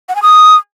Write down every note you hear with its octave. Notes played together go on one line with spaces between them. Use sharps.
F#5
G#5
D#6